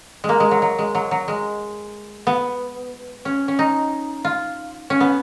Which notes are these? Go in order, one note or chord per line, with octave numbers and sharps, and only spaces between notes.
G#3
A#3
G#3
F#3
F#3
G#3
F#3
F#3
G#3
B3
C#4
C#4
D#4
F4
C#4
B3